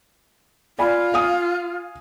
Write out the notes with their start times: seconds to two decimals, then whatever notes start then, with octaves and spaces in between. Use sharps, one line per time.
0.79 F4 D5 G#5 B5
1.14 F5 G#5 D#6